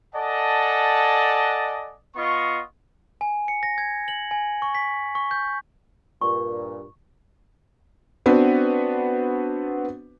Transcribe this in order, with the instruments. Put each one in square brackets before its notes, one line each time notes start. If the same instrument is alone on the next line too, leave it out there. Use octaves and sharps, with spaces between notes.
[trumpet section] A4 D5 D#5 F#5 G#5 A5
B3 F4 D#5 C#6
[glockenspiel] G#5
C#7
A#6
G#6
F#7
G#5
C#6
B6
C#6
G6
[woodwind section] G2 A#2 [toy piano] C#6
[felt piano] B3 C4 D4 F#4 B4